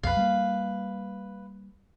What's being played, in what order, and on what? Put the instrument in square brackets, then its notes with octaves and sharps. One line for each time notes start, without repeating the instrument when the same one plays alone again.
[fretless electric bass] B1 F2 [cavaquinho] B4 F5
[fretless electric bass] G3 G#3 A#3